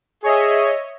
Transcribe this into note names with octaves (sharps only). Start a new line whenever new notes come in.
G#4 C#5 D#5 E5